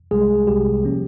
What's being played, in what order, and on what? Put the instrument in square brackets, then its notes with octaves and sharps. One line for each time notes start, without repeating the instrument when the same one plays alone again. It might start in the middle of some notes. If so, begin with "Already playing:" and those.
[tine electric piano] C2 C3 G3 G#3 G#4
C2 C3 G3 G4
F3 A#3 C#4